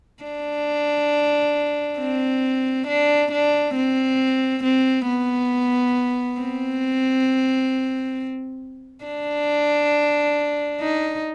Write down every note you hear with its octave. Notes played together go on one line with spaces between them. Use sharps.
D4
C4
D4
D4
C4
C4
B3
C4
D4
D#4